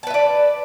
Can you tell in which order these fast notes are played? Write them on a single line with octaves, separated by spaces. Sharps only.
A5 B4 E5 D5